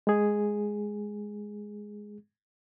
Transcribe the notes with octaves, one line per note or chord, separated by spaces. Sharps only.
G#3 G#4